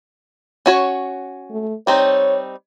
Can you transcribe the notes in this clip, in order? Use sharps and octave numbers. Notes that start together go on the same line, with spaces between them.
C#4 F#4 C#5
A3
G3 C4 D#4 C#5